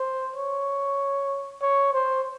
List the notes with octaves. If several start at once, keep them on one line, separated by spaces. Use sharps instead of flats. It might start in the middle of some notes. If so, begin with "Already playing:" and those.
Already playing: C5
C#5
C#5
C5